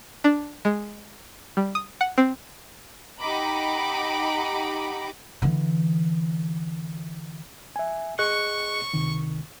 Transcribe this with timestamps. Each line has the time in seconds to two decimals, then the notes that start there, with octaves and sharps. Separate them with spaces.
0.24 D4
0.65 G#3
1.57 G3
1.75 D#6
2.01 F#5
2.18 C4
3.20 D#4 G4 F#5 A#5 B5 D6
5.42 D3 E3
7.76 E5 G#5
8.19 G#4 D#5 C#6 F#6
8.94 C#2 C3 D#3